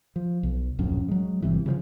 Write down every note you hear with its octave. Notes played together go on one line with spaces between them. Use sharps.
F3
B1
D1 A#1 F#2 C#4
F#3 G#3
G1 G2 C3 E3
C#3 E3 F3